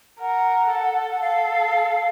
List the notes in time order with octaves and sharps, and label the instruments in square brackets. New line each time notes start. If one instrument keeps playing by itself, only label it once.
[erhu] A#4 [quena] F#5
[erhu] A4
[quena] F#5
[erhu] A4 [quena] F5